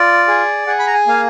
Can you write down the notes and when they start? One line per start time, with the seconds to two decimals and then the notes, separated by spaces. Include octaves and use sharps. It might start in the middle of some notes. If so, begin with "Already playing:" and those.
Already playing: F4 D5
0.28 G#4
0.67 G#4 F#5
0.79 B5
0.87 A#5
0.93 G#5
1.07 A#3 F5